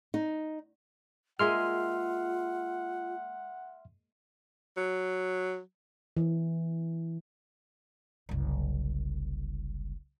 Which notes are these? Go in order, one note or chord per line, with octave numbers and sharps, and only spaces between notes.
D#4
G#3 A#3 F4 G#4 E5 F#5 C6 F6
F#3
E3
F#1 C2